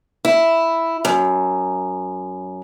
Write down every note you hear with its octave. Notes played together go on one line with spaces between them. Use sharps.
E4
F#2